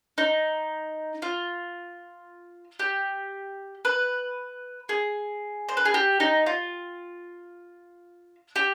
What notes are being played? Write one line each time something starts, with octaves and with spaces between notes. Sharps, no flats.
D#4
F4
G4
B4
G#4
C5
B4
G#4
G4
D#4
F4
G4